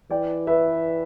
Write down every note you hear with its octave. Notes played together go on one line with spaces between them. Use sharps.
E3 D5 G5
B4 E5